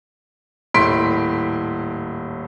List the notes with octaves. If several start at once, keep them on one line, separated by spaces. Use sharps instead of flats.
D#1 A2 C6 B6 D7